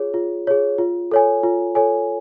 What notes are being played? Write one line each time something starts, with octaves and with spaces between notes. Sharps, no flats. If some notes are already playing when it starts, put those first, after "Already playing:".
Already playing: F4 G#4 C#5
F4
G#4 C#5
F4
A4 C#5 G#5
F4
A4 C#5 G#5